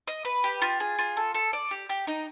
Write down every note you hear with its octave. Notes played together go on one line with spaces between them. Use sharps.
D#5
B4
G4
F4
G#4
F4
A4
A4
D5
G4
G4
D#4